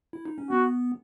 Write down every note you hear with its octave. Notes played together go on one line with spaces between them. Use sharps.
E4
D#4
C#4
B3 F#4